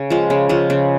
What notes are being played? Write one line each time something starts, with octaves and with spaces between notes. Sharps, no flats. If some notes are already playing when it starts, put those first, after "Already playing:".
Already playing: C#3
F3 G#3
C#3
F3 G#3
C#3